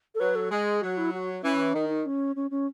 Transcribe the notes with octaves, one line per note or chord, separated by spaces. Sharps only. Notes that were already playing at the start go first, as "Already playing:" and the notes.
A4
F#3 B4
A4
G#3 G#4
F#3 F#4
E4
F#4
E3 C#4
D#3 D#4
D#4
C#4
C#4
C#4